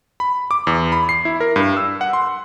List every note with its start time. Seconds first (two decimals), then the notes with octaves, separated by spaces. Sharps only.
0.20 B5
0.51 D6
0.67 E2
0.92 B5
1.09 C7
1.25 E4
1.40 A#4
1.56 G2
1.77 E6
2.01 F#5
2.13 C6